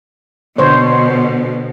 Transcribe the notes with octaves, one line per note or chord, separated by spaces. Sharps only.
B2 D3 C5 C#5